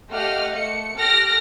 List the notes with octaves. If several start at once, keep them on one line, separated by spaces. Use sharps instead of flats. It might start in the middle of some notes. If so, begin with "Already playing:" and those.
A3 G4 D#5 F5 F#5 F6
A3 C#7
G4 A4 F6 F#6 A#6 D7